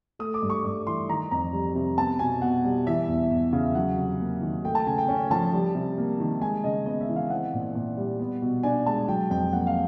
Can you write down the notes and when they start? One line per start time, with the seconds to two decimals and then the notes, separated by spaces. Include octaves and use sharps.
0.19 A3 D#6
0.34 D6
0.42 G2
0.50 C#6
0.64 G2 D6
0.86 E3 C6
1.09 D#3 A#5
1.31 F2 A#5
1.53 G3
1.75 C3
1.98 B3 A5
2.19 B2 G#5
2.42 B2 F#5
2.64 G3
2.87 E3 E5
3.08 E2
3.30 E2
3.53 C#3 F5
3.75 F#3 F#5
3.97 C3
4.20 A#3
4.42 D#3
4.64 A3 G5
4.75 A5
4.87 C#3 G#5
4.98 G5
5.08 C#4 G#5
5.31 F3 A5
5.53 G3
5.75 C3
5.98 A#3
6.20 D#3
6.41 G#3 G#5
6.64 C#3 D#5
6.86 B3 D#5
7.01 E5
7.08 E3
7.16 F5
7.30 C4 F#5
7.54 A#2
7.75 A#2
7.97 G3
8.20 B3
8.42 B2
8.63 D4 G#5
8.86 G#3 A5
9.08 F#3 G5
9.30 F2 G5
9.53 A#3 F#5
9.67 F5